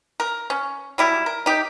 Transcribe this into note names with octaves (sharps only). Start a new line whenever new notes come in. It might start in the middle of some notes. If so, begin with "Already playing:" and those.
A#4
C#4
F#3 G3 E4
A#4
D#4 G4